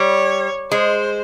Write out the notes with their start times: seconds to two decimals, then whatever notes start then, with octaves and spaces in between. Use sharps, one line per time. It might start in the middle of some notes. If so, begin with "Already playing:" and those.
Already playing: G3 C#5
0.71 G#3 C5